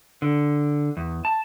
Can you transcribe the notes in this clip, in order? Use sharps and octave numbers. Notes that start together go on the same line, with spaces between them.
D3
E2
A5